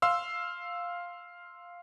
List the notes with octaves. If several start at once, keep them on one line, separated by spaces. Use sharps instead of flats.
F5 C6 E6